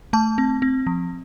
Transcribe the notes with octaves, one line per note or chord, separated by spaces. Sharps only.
A3 A5
C4
C4
F3